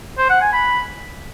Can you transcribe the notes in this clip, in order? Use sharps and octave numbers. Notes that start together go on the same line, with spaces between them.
C5
F#5
G#5
B5